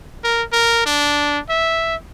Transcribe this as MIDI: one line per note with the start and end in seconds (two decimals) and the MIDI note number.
0.24 0.43 70
0.52 0.86 70
0.86 1.39 62
1.49 1.95 76